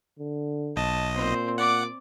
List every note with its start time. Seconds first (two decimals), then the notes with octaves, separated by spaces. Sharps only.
0.19 D3
0.76 B1 D#5 A5
1.15 A#2 C4 C5
1.58 D5 F#5 D6